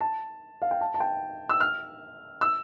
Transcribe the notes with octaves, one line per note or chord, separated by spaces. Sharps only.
A5
F5
G5
A5
A5
G5
E6
F6
E6